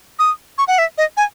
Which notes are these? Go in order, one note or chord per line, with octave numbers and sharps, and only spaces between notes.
D#6
C#6
F#5
E5
D#5
G#5